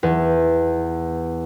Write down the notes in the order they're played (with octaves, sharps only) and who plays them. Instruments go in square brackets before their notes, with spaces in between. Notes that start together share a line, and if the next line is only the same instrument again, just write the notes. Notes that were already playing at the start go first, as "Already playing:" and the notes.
[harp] E2